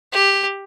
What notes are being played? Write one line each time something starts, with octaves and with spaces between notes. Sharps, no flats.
G4